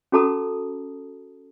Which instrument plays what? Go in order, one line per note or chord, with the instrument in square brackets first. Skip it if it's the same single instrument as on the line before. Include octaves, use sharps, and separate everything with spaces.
[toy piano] C#4 F#4 A4 A5 A#5 D#6